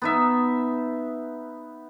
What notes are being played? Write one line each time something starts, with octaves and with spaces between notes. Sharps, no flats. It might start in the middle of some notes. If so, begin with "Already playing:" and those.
B3 D#4 E5